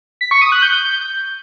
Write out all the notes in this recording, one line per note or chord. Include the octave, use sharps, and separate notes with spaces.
B6
C#6
D#6
F#6
G6